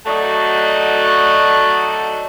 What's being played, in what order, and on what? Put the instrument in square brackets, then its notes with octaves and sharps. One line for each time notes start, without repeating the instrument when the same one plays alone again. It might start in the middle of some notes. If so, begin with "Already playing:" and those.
[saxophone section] F#3 A3 D#4 F#4 D5 D#5